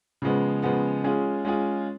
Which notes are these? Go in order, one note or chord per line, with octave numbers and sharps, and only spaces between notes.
C#3 F3 G#3 B3
C#3 F3 G#3 B3
G#3 C#4 F4 G#4
G#3 C#4 F4 G#4